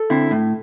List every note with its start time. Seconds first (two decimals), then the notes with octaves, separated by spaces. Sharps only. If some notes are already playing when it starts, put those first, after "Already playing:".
Already playing: A4
0.10 D3 C4 E4
0.31 A2